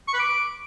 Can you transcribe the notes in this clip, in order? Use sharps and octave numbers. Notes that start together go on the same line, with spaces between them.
C#6
B4
D6